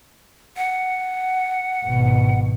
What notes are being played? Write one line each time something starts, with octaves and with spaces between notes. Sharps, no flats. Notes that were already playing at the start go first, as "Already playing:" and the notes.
F#5
G#1 B2